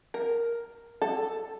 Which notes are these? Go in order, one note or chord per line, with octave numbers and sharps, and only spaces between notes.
A#4
A4